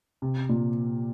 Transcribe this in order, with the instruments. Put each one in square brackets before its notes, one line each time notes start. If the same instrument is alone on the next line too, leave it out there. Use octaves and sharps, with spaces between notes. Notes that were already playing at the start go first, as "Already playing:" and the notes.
[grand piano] C3
A#2